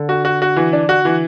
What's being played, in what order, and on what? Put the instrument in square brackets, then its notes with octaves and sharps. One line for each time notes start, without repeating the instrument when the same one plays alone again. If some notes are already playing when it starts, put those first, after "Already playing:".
Already playing: [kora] D3
[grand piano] F#4
F#4
F#4
E3
D4
F#4
E3